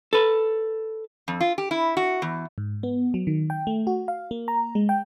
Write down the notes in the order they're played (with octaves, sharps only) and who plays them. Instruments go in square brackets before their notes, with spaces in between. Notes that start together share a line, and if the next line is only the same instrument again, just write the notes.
[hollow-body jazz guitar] A4 B4
[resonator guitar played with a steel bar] F2
F4
G4
E4
F#4
E2
[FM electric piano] G#2
B3
F#3
D#3
G5
A3
F#4
F5
A#3
A#5
G#3
G5